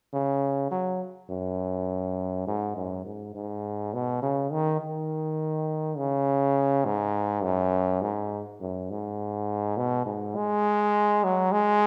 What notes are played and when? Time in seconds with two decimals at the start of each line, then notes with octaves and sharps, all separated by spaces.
0.13 C#3
0.71 F#3
1.30 F#2
2.47 G#2
2.76 F#2
3.05 G#2
3.35 G#2
3.94 B2
4.22 C#3
4.52 D#3
4.80 D#3
5.97 C#3
6.85 G#2
7.43 F#2
8.01 G#2
8.61 F#2
8.90 G#2
9.77 B2
10.06 G#2
10.36 G#3
11.24 F#3
11.52 G#3